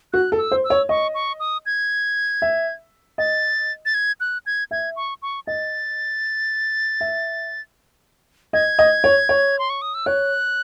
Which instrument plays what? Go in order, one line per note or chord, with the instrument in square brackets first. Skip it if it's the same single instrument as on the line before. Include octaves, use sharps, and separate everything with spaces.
[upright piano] F#4 [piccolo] F#6
[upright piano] A4
[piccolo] E6
[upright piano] C5
[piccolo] E6
[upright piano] C#5
[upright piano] D#5 [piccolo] C#6
[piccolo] C#6
D#6
G#6
[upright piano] E5
[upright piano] D#5 [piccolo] A6
[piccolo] A6
G#6
F#6
G#6
[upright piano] E5 [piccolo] G#6
[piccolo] C#6
C#6
[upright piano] D#5 [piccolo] A6
[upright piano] E5
[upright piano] D#5 [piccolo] G#6
[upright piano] D#5
C#5
C#5
[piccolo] C6
C#6
D#6
E6
[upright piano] C#5 [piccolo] F#6